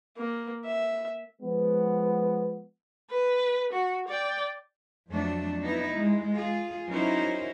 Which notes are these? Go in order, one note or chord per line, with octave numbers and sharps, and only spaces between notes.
A#3
E5
F3 G#3 B3
B4
F#4
D5 G5
F2 F#3 A3 D4
B3 D#4 E4
G#3
F4 G#4
F#3 C#4 D#4 E4 A#4 C5